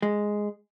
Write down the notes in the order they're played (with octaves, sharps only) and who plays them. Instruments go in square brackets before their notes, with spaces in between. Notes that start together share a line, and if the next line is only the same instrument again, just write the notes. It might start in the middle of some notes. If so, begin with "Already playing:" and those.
[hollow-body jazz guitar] G#3